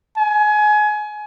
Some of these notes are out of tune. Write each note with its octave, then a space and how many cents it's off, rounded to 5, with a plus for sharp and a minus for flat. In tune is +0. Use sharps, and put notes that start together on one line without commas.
G#5 +25